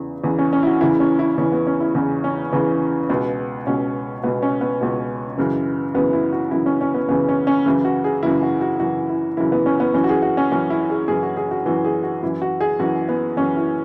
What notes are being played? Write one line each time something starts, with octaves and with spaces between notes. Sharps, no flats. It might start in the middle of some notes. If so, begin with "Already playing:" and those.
Already playing: E2 C#3 E3
E2 C#3 E3
C#4
C#4
E4
F#4
E2 C#3 E3 E4
C#4
E4
E2 C#3 E3 C#4
B3
C#4
E4
E2 C#3 E3 B3
C#4
E2 C#3 E3
C#2 B2 B3
C#2 B2 C#4
C#2 B2 B3
C#4
B3
C#2 B2
F#2 C#3 E3
F#2 C#3 E3 B3
E4
F#4
F#2 C#3 E3 E4
C#4
C#4
B3
F#2 C#3 E3 B3
C#4
C#4
F#2 C#3 E3 E4
F#4
G#4
F#2 C#3 E3 E4
F#4
F#4
F#2 C#3 E3 F#4
E4
F#2 C#3 E3 E4
B3
C#4
B3
F#2 E3 C#4
F#4
G#4
F#4
C#4
F#2 E3 C#4
E4
G#4
F#2 E3 G#4
F#4
G#4
F#4
F#2 E3 F#4
G#4
F#4
F#2 E3 E4
F#4
G#4
F#2 E3 F#4
B3
F#2 E3 C#4
E4